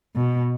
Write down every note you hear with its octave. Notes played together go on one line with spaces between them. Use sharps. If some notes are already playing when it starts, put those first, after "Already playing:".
B2